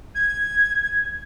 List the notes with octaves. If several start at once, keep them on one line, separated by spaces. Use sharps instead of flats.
G#6